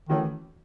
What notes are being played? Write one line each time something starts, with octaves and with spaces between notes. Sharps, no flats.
D#3 E3 A3 C#4 F#4